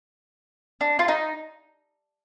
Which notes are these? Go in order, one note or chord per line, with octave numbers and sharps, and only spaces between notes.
D4
F4
D#4